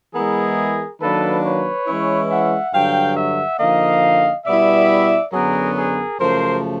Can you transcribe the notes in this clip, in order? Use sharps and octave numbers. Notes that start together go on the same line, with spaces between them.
E3 G#3 B3 E4 G#4 A#4
D#3 F#3 A#3 D4 A4 B4
B4 C#5
E3 G#3 C#4 E4
E5 F#5
G2 D3 F#3 F5 G5
E5 F#5
D3 F3 A#3 D#4 D#5 F5
B2 G3 B3 E4 D5 E5
F#2 D3 F#3 B3 G#4 A#4
G#4 A#4
F#2 C#3 F3 A3 A#4 C5